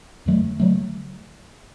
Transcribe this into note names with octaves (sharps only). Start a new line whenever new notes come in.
F2 D3 F#3 A3
D3 F#3 A3